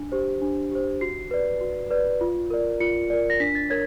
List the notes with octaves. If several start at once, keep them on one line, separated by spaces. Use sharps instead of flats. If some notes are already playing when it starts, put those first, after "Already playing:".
Already playing: D4
G4 C5
D4
G4 C5
F#4 C7
B4 D5
F#4
B4 D5
F4
A#4 D5
F4 C#7
A#4 D5
A#6
D4 B6
A6
A#4 C#5 G#6